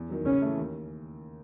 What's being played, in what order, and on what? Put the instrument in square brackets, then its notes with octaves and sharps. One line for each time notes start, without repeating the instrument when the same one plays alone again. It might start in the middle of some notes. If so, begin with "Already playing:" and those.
Already playing: [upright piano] E2
D#3 F#3
[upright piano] C#3 [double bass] C#4
[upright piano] E3 A3
D#2